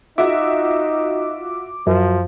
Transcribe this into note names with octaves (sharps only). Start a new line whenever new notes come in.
D#4 F4 F#4 E5 D6
F#2 F3